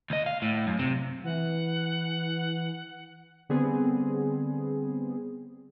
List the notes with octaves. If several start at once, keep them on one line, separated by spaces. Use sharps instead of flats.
D2 D#5
F5
A2
F#2
C3
E3 F#5
D3 G3 B3 C4 G#4